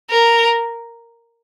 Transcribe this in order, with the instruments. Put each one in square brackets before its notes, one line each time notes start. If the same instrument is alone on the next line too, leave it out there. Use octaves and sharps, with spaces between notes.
[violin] A#4